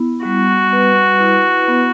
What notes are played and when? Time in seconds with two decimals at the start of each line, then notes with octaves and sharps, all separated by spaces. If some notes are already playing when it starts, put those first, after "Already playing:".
Already playing: B3 E4
0.25 G3 F#4
0.73 B4
1.20 E4
1.68 B3